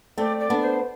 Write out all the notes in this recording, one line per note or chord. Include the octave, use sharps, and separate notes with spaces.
A3 C4 D5
D5
B3 D4
C5